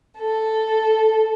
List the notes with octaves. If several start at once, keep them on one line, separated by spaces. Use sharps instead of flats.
A4